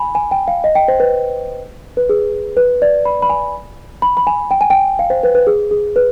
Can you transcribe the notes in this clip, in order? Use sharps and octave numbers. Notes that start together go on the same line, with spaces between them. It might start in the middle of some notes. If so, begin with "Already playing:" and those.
Already playing: G#5 B5
G#5
G5
F5
D#5
G5
C5
B4
B4
G#4
B4
D5
B5
B5
G#5
B5
B5
G#5
G5
G#5
G5
F5
C5
B4
B4
G#4
G#4
B4